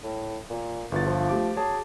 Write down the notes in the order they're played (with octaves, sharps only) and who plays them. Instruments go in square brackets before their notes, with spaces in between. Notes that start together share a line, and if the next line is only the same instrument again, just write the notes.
[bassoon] A2
A#2
[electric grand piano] G1 F4 A6 [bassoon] E2
[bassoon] F3
[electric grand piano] A3 G4 D6
[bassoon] F#3 [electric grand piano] G#4 A5